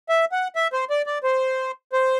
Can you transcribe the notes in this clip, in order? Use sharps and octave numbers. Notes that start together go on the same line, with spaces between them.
E5
F#5
E5
C5
D5
D5
C5
C5